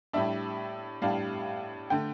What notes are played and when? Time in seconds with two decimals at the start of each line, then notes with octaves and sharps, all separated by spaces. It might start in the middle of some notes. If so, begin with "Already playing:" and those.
0.13 A2 G3 D4 E5
1.02 A2 G3 D4 F5
1.90 D3 A3 G5